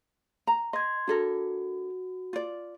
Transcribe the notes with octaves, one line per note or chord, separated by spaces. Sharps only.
A#5
D#5 C6 G#6
D4 F#4 A4 A#4
F4 D5